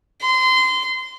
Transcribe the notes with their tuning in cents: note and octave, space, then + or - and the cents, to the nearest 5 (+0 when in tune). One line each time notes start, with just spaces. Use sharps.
C6 -25